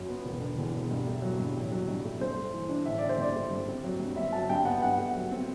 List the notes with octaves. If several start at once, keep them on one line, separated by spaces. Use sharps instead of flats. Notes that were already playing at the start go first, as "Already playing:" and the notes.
Already playing: G1 F#2 F#3
B3
E1
D3
E2
E1
G2
A3
F#3
G2
A1
F#3
G2
A3
G2 C5
A3
E3
D4
A1 E5
D3 D5
C5
G2 D5
A3
G2
C4
F#3
G2
G1 E5
F#3 A5
G2 G5
B3 F#5
G2 F#5
A3
F#3
C4